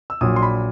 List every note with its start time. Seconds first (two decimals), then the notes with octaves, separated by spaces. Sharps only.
0.10 E6
0.21 A#1 A#2 F#3 D#6
0.36 C6
0.43 B5